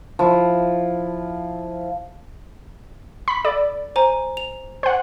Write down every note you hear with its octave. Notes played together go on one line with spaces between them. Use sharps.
F3 E4
B5
A4 D5
C5 G#5 A#5
F7
C5 F#5